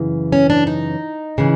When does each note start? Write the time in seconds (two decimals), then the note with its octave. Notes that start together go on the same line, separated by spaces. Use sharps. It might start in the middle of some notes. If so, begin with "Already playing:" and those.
Already playing: F#2 C#3 E3
0.32 C#4
0.50 D4
0.67 D#4
1.38 C#3 E3